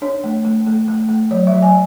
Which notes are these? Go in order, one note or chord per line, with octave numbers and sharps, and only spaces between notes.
D4 C#5
A3
A3
A3
A3
A3
F#3 C#5
E5
F#3
G#5